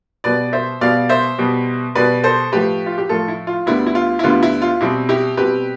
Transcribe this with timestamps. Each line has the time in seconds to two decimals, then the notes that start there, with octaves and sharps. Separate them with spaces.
0.24 B2 G3 B3 B4 D5
0.53 C5 E5
0.81 B2 G3 B3 D5 F5
1.09 C5 E5
1.38 B2 G3 B3
1.95 B2 G3 B3 B4 D5
2.24 A4 C5
2.52 A2 F3 A3 G4 B4
2.86 F4
2.98 G4
3.09 A2 F3 A3 F4 A4
3.28 E4
3.47 F4
3.66 D2 D3 G3 B3 E4
3.87 E4
3.95 F4
4.19 E4
4.23 D2 D3 G3 B3 F4
4.43 E4
4.62 F4
4.81 B2 G3 C4 E4
5.09 E4 G4
5.37 B2 G3 C4 G4 B4